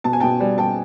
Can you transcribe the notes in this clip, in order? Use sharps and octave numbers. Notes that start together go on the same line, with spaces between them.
B2 A5
G#5
B2 G5 A5
G3
G3 G5 A5